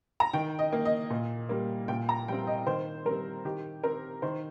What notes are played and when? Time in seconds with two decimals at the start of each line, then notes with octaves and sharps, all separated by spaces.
0.20 A#5
0.33 D#3 G5
0.59 D#5
0.72 A#3
0.85 D#5
1.10 A#2
1.49 G3 A#3
1.88 A#2 G5
2.09 A#5
2.28 G3 C4 G5
2.47 D#5
2.67 D#3 C5
3.05 G3 C4 A#4
3.45 D#3 G4
3.83 C4 A#4
4.22 D#3 C5